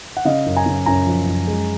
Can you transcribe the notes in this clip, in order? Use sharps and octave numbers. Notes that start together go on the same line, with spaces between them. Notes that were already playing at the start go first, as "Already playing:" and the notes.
F#5
C#3 D#5 F5
F#2
G#5 A#5
C#3
F#2 G#5 A#5
F3
F#2
G#3